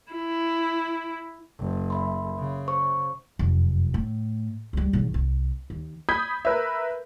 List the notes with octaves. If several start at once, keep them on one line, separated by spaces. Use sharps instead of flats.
E4
F#1
E5 B5 C6
C#3
C5 C#6
F1 F#2
A2
C#2 G3
B1 E2
C2
D#2
B5 D#6 G6 G#6 B6
A#4 B4 E5